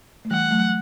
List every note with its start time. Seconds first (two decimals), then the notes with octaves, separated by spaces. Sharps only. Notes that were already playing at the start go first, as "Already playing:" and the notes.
0.25 A3
0.31 E3 G3 F#5
0.51 F#3 A3